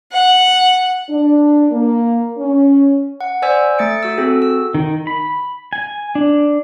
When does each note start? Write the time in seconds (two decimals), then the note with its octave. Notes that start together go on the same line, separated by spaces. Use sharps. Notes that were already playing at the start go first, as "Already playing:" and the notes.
0.12 F#5
1.09 D4
1.71 A#3
2.37 C#4
3.21 F#5
3.42 C5 D5 G#5 E6 G#6 B6
3.78 A3 A6 C#7 D7
4.03 F#4 E6
4.17 C4 F#4 G#4 A4
4.42 E6
4.75 D#3
5.07 B5
5.73 G#5
6.15 D4